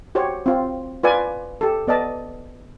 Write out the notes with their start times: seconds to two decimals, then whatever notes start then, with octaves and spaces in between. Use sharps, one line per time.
0.15 F#4 G4 C5 C#5
0.46 C4 F4
1.03 F4 B4 D5 G#5
1.61 G4 A4
1.88 B3 D5 D#5 A5